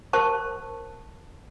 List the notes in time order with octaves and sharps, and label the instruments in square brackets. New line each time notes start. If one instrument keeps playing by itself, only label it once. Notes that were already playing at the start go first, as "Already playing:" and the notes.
[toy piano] A#4 C5 A5 C#6